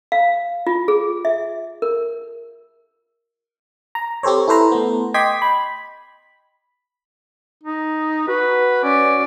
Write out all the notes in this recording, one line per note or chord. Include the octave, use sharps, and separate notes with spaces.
F5
F4
G#4
E5
A#4
A#5
C4 G4 A4 C5 C#5
E4 A4 B4 C5 A#5
A3 B3
D#5 G5 C6 D6 G#6 B6
B5
D#4
F#4 B4
C#4 D5